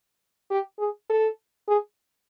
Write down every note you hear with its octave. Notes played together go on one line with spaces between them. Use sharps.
G4
G#4
A4
G#4